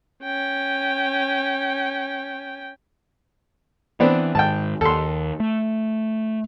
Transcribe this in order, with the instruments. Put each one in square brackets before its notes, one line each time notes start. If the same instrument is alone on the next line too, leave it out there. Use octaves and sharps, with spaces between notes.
[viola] C#4 G5
[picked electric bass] E3 [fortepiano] B3 C4 D4
[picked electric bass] G#2 D#3 [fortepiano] G5 A5
[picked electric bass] D#2 [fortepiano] A4 C6
[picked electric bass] A3